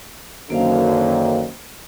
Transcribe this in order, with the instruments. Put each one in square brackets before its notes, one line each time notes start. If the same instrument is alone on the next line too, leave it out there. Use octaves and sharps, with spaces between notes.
[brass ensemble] F#2 D3 D#3 [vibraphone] A#3 C5 F5